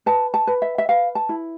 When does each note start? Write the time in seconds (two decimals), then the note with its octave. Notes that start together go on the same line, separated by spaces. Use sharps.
0.06 B4 A5
0.34 A5
0.47 B4
0.62 E5
0.78 E5
0.89 B4 F5
1.15 A5
1.29 E4